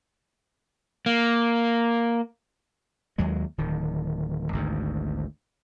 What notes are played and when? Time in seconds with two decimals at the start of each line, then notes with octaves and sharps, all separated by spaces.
1.06 A#3
3.18 D#2 F#3 G#3
3.58 D1 D#3
4.53 G#1 D2 G#2